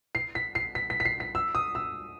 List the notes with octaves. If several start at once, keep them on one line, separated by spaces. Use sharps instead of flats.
C7
B6
C7
B6
B6
B6
C7
B6
E6
D#6
E6